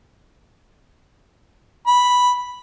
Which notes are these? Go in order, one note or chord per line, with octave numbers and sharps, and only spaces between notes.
B5